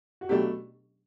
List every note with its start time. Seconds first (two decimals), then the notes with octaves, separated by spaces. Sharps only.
0.21 F#4
0.29 B2 F#3 A3 D4 G4